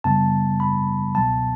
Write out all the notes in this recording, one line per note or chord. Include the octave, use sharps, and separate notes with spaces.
F#2 C#3 G3 B3 A5
B5
C#2 B2 F#3 B3 A5